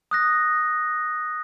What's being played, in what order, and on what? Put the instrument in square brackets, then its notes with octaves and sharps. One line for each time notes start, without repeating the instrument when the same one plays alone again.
[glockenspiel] D#6 F#6 A#6